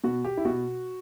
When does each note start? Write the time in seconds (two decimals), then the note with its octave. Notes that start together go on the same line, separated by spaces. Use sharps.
0.04 B2 F#4
0.25 G4
0.37 E4
0.45 B2 F#4